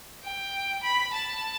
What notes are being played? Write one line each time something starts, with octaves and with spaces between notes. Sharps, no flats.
G5
B5
A5